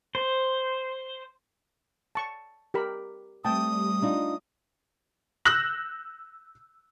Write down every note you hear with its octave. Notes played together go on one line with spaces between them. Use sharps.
C5
A5 C#6
G4 A#4 B5
G3 A3 C4 G5 A5 D#6
D4 D#4 F4
E6 F#6 G6 A#6 F#7